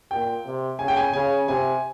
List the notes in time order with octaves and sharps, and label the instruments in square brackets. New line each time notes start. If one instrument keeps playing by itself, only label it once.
[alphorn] A#2 [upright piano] G5
[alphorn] C3
[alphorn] C#3 [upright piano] G#5
[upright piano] G5
G#5
[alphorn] C#3 [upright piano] G#5
[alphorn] C3 [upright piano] G#5